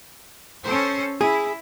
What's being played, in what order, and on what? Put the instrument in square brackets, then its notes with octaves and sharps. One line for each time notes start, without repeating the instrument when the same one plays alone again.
[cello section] C#4 A4 C5
[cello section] E4 [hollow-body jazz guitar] G#4